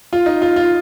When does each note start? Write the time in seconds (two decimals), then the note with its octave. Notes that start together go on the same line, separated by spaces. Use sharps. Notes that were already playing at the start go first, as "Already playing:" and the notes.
0.13 F4
0.26 D#4
0.42 F4
0.56 F4